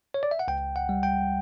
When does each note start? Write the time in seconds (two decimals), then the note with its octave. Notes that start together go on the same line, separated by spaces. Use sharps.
0.14 C#5
0.23 D5
0.31 E5
0.39 F#5
0.48 C#2 G5
0.76 F#5
0.89 G3
1.03 G5